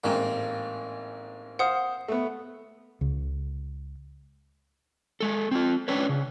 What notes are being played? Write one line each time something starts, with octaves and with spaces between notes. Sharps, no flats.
A1 G#2 A#3 C4
C5 F5 F#5 D#6
A3 B3
C#2
G#3 A4
C4 F4
C#4 D4 B4 C#5
C#3